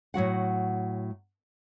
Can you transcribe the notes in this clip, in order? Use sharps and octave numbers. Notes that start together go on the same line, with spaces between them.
A2 F#3 F#4 F#5